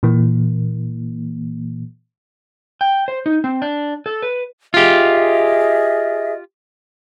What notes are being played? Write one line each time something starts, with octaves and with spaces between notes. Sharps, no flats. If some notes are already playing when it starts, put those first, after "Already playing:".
A#2 E3 A#3
G5
C5
D#4
C4
D4
A4
B4
F4 G4 G#4 D#5 E5